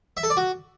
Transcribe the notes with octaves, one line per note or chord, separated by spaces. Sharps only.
E5
A4
D5
F#4